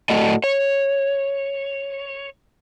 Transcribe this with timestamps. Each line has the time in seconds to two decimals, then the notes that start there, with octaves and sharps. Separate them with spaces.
0.10 A2 A3 F#4 A4 D5 D#5
0.44 C#5